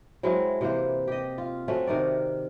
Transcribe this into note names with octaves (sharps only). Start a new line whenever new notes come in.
F#3 G#3 C4 E4
C3 E3 A#3 C5
G4 D#5
F4
A3 C4 C#4 F#4
C3 D#3 A#4 D5